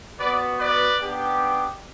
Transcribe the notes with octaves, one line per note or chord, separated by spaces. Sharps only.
B3 F#4 B4 D5
B4 D5
B3 D4 G4